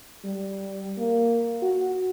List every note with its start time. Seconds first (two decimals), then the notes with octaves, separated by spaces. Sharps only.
0.25 G3
0.98 A#3
1.63 F#4